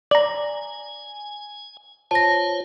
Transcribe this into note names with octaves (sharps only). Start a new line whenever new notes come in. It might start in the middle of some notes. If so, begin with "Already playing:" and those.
D5 G#5 A#5 F#7
F4 C5 C#5 A5 A#6